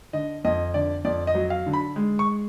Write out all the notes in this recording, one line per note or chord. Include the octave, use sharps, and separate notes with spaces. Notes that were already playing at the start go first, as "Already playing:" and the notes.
D3 D#5
F2 D#5
D3 D5
F2 D5
D#5
F#3
F5
D3
B5
G#3
C#6